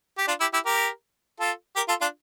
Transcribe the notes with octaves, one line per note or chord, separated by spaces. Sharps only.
G4
D4 F4
E4 G4
E4 G4
G4 A#4
F4 A4
G4 A#4
F4 A4
D4 F4